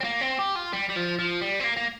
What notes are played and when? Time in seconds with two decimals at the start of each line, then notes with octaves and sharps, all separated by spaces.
0.01 C4
0.04 A#3
0.21 C4
0.39 G4
0.56 F4
0.73 G3
0.90 G3
0.96 F3
1.19 F3
1.41 G3
1.60 C4
1.64 A#3
1.77 A#3